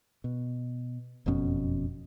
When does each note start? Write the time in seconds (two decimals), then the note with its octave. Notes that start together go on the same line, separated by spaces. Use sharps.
0.24 B2
1.26 F#1 F2 B2 C#4